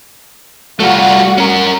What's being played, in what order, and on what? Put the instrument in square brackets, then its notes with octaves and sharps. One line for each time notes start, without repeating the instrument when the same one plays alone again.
[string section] G3 F#4 F#5 [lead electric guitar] A3 F4
[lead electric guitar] C#4 A#4